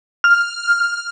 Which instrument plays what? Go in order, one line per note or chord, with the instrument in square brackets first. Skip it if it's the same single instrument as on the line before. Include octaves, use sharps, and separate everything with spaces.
[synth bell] F6